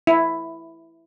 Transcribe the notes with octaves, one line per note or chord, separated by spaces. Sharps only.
E4